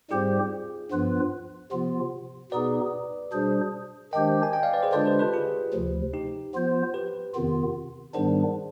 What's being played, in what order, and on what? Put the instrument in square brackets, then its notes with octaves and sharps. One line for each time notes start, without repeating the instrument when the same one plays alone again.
[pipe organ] G#2 G3 C4 G4 C5 [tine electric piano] F4 G#4
[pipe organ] G2 F3 B3 F4 B4
C3 F3 B3 F4
[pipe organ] B2 B3 D#4 G#4 [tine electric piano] B4 D5
[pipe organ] B2 G3 D4 G#4 C5
[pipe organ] D#3 G#3 D4 G4 C5 [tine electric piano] D#5 G5
[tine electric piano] G#5
D#5 G5
D5 F5
B4 D5
G#4 C5
[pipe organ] D3 G#3 D4 F4 C5 [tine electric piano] B4 D5
[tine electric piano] G4 B4
G4 B4
F4 G#4
[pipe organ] D2 C3 F3
[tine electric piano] D#4 G4
[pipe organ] F3 B3 F4 C5
[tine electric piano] G4 B4
[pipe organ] F2 C3 D#3 B3 F4
[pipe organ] G#2 D#3 G3 B3 D4 [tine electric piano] G#4 C5